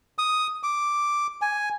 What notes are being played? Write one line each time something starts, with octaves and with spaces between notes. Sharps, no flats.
D#6
D6
G#5